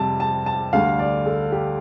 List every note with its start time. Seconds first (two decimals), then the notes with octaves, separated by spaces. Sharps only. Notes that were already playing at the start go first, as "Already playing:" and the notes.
Already playing: F2 C3 G3 A5
0.20 A5
0.46 A5
0.73 D2 D3 G3 F5
0.99 D5
1.26 A4
1.52 G4